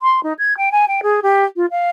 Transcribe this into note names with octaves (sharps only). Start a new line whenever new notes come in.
C6
D#4
G#6
G5
G#5
G5
G#4
G4
F4
F5